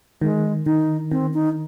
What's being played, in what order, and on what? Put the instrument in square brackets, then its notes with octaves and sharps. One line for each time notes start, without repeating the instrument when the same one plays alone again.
[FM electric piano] D#3 [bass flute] G#3
[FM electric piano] D#3 [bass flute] D#4
[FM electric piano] D#3 [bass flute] C4
[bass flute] D#4